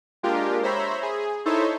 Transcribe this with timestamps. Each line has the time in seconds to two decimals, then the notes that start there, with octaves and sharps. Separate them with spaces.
0.23 G#3 A#3 D4 F4 G4 A#4
0.63 C5 C#5 E5 A#5 B5
1.03 G#4
1.46 D#4 E4 A4 C5 C#5 E5